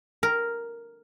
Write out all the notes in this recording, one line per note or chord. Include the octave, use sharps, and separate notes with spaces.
A#4